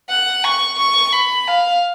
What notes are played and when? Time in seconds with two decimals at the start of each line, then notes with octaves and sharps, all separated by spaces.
0.09 F#5
0.44 C#6
0.78 C#6
1.13 B5
1.47 F5